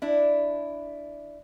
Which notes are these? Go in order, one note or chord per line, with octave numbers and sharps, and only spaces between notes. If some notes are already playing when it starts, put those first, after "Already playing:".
D4 E4